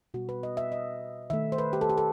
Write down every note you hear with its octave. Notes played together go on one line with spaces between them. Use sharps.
B2 G3 B3 F#4
B4
D#5
E5
D#5
D#3 A3 E5
C5
B4
G4
A4
G4
A4